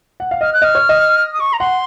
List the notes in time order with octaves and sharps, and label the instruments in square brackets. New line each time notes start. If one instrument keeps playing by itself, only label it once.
[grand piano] F#5
F5
[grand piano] D#5 [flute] F6
[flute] F#6
[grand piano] D#5 [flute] F6
[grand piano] C#5
D#5
[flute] D#6
C#6
A#5
[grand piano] F#5 [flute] C6